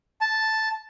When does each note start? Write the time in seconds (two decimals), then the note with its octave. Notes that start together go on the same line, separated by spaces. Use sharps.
0.21 A5